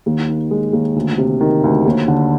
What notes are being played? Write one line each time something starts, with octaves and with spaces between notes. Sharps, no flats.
D#2
D#3
G#3
D#2
D2
C3
D#3
D2
D#2
D3